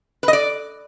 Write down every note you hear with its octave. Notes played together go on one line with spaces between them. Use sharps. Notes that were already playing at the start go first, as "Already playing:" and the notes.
B4
D#5
D5